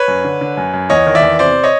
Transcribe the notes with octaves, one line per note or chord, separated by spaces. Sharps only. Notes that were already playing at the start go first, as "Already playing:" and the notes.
Already playing: B4 C#5
F#2
D3
D3
F#2
F#2
E2 C#5 D#5
D#3
D5 E5
E2
C3 C5 D5
C#5 D#5